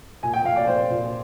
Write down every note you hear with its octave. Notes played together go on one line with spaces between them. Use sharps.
A#2 G#5
G5
A#2 F5
D5
A#2 C5
A#2